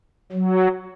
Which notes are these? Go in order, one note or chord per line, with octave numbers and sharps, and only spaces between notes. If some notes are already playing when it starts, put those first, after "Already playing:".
F#3